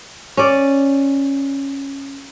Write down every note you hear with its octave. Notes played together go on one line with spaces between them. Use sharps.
C#4 D5